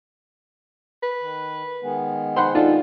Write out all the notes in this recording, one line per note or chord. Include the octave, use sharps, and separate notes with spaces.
B4
D#3
D#3 G#3 B3
C5 F#5 B5 C6
D4 D#4 F4 A4